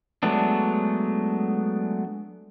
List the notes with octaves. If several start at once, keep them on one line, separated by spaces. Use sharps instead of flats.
F#3 G#3 A3 B3 D4